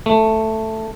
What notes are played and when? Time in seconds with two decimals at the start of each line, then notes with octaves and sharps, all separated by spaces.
0.06 A3